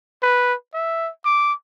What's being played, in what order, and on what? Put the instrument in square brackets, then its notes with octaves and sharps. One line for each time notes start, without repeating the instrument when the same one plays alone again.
[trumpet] B4
E5
D6